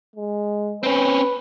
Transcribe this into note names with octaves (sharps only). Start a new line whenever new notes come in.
G#3
C4 C#4 B4